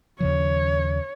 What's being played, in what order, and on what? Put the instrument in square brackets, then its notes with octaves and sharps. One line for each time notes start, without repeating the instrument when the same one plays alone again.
[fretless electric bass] D#2 C#3 F3 [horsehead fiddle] C#5